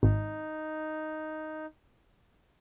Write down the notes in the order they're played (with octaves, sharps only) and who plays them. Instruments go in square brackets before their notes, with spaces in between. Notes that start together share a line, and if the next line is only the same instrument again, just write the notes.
[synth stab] G#1 [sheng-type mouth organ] D#4